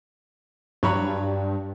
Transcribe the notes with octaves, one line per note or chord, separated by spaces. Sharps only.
G2 F#3 C#5 B5